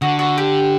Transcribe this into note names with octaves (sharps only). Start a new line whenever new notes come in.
D3 F#4
F#4
G4